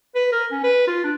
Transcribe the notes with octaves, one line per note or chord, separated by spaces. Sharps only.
B4
A#4
C#4
B4
F4
D4